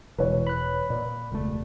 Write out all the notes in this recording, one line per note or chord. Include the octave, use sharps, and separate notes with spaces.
E1 B2 E3 G#3 B4 C#5
B5 F#6
A#2 D5
E1 C#2 A3